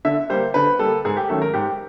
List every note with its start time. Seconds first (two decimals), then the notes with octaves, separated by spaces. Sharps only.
0.05 D3 E5
0.30 G3 A#3 C5
0.54 D3 B4
0.79 G3 A#3 A4
1.05 G#2 G#4
1.17 G4
1.29 D#3 F#3 A3 C#4 A4
1.42 A#4
1.53 G#2 G4